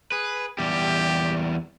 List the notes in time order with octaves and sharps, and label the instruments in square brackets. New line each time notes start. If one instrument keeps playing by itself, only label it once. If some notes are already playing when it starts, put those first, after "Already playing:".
[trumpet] G#4 [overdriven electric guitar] B4
[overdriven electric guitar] E2 G3 [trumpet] G4